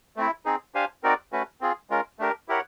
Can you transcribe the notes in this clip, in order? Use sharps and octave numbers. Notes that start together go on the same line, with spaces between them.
A3 C4 E4
C4 D#4 G#4
D4 G4 C5 F5 G#5
C4 D#4 F#4 A#4 D5
A3 C#4 F#4 B4
C4 F4 G#4
G#3 C#4 F4 A#4
A3 D4 G4 A#4
E4 G4 A#4 C#5 F#5